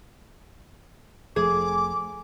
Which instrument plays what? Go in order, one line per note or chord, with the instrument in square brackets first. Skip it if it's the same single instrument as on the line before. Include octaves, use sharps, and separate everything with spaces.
[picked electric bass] F1 F3 A3 [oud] G#4 [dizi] D6